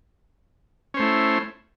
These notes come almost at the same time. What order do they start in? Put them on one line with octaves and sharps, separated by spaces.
C#4 C5 A3 E4